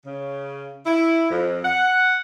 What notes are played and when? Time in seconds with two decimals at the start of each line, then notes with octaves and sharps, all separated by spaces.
0.05 C#3
0.86 E4
1.30 F2
1.64 F#5